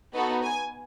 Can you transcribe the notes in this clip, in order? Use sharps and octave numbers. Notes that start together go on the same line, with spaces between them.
B3 D#4 F#4 A4
G#5